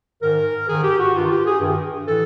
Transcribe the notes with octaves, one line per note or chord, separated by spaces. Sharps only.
G#2 D#3 A#4
G#2 D#3 G#4
G4
F#4
G2 D#3 F4
G4
G#4
G2 D#3
A2 E3 A4